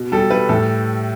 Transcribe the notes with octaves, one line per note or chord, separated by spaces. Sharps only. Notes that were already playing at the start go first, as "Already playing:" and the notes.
Already playing: B2
G3 A4
G3 B4
A2 A4